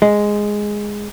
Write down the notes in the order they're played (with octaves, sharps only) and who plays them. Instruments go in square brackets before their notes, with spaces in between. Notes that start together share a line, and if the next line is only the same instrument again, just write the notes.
[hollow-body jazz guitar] G#3